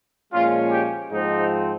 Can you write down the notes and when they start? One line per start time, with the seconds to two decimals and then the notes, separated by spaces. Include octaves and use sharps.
0.32 A#2 F3 G#3 C#4 F4
0.71 G4
1.10 G#2 F3 C4 D#4